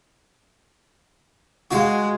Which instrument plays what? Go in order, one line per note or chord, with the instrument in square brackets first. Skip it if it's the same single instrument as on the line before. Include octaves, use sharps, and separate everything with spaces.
[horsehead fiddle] G#3 [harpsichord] F#4 F5